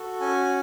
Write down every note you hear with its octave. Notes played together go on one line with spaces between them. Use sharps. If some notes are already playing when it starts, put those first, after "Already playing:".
Already playing: F#4 A4
C#4 G#5